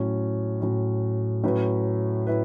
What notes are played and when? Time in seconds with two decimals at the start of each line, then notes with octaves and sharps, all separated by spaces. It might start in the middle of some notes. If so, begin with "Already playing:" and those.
Already playing: A2 F#3 C#4
0.61 A2 F#3 C#4
1.44 A2 F#3 C#4 E4 B4
2.27 E4 B4